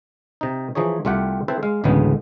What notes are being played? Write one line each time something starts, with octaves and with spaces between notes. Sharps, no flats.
C3 D#4
E3 F3 D#4 G#4 C#5
C2 G3 A3 F4 G4 F#5
C4 E4 A4 B4 C5
G#3 F5
A1 D2 A2 C#3 G#3 B3